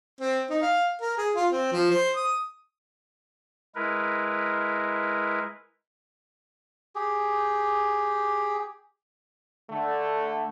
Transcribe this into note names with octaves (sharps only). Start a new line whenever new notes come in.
C4
D#4
F5
A#4
G#4
F4
C4
F3
C5
D#6
G#3 E4 A#4 B4
G4 G#4
D3 A3